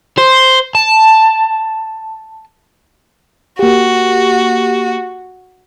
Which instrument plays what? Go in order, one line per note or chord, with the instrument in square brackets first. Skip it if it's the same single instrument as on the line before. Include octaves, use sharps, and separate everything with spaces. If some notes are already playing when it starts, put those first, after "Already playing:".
[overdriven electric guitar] C5
A5
[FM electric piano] A#3 G4 [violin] F#4